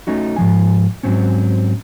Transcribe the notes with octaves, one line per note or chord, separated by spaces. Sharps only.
A3 C#4 D#4 F#4
G#2 F3 G#5
G#2 D#3 F#3 C4 C#4